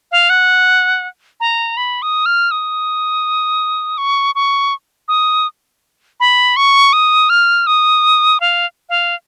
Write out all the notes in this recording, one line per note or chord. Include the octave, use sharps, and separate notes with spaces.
F5
F#5
A#5
B5
D#6
F6
D#6
C#6
C#6
D#6
B5
C#6
D#6
F6
D#6
F5
F5